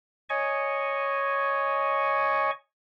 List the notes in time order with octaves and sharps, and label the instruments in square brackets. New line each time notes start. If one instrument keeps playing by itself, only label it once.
[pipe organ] C#5 D#5 G#5 C#6